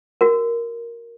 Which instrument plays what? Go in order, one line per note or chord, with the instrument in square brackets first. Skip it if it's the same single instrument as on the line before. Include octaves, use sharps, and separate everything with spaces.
[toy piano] F#4 A#4